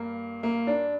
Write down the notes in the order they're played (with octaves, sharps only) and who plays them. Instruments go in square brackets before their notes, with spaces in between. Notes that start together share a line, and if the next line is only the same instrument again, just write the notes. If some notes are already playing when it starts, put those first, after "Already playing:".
Already playing: [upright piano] G2 A#3
A#3
D4